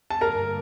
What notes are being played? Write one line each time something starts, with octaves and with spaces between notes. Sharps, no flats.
A5
G2 D3 G3 A#3 A#4 A#5